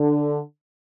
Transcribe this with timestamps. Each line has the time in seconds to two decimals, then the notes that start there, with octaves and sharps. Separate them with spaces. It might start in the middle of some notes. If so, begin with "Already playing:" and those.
Already playing: D3